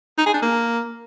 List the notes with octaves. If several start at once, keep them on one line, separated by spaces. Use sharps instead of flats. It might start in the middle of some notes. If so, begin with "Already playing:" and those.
D#4
G#4
D4
A#3